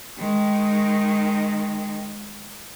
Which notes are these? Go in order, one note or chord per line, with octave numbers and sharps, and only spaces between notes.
D#3 G#3